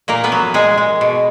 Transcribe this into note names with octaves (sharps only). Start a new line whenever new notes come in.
A#2 A#3 A#4
B3 B4
F#3
A#2 G#3 G#4
G#3
B2